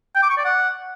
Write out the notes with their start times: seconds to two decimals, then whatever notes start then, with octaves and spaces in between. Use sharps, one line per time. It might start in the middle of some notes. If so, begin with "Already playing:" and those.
0.15 G5
0.23 D6
0.30 C#6
0.37 D5
0.45 F#5